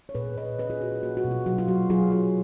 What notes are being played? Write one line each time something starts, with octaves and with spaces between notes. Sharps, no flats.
C#5
A#2 G#4 B4
A#2 B4 D#5
C#4 B4 D#5
F4 G#4
F4 F#4
F4
A#3 F#4
F#4
B2
F4
F#3 F#4
F4
F#3 F#4
F#3 F4 G#4
F4